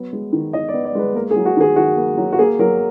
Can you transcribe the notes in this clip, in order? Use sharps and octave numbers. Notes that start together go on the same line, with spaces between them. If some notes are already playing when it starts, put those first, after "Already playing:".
Already playing: F#3 B3
G#3
D#3
D#3 D#5
D5
B3
D5
G#3 B4
A#3 A#4
G#4
F#3
F#4
D#3 G#4
D#3 F#4
A#3
F#3
F#4
A#3 G#4
F#3 A#4